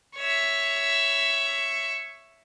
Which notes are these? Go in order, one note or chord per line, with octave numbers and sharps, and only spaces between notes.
C#5 E5